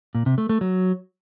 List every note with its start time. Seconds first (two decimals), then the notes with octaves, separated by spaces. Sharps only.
0.15 A#2
0.26 C3
0.38 A3
0.49 A3
0.61 F#3